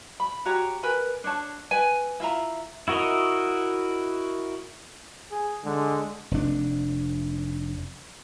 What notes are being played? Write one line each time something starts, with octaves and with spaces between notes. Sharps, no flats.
B5
F#4 G4 C#5 A#5
A#4 B4 G#5
D4 C#5 A5
B4 G5 G#5
E4 F4 E5 A#5
E4 F#4 A#4 D#5
G#4
D3 G#3
F1 D4